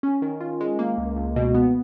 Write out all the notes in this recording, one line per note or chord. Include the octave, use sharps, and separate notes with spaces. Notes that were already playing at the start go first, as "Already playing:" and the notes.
C#4
D#3
F4
G#3
A#3
C#2
C#2
B2
B3